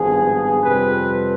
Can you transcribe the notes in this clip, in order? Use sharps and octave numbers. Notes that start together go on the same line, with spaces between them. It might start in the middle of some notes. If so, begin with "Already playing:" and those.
Already playing: G#1 G2 F3 B3 G#4
F2 C3 G3 C4 B4